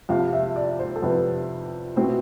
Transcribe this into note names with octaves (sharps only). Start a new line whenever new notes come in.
F2 C3 F3 F5
E5
D5
C5
A4
F2 C3 F3 B4
B2 A3 C4 E4 C5